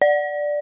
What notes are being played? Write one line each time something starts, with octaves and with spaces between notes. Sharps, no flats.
D5